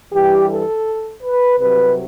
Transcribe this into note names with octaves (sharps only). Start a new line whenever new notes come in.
G2 E3 G3 G4
A4
B4
C2 C3 F#3 B4